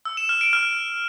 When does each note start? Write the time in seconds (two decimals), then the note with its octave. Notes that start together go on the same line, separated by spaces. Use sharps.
0.05 E6
0.17 E7
0.29 F6
0.41 D7
0.53 F6